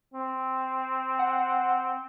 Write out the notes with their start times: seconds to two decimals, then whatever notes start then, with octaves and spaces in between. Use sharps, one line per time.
0.14 C4
1.19 F#5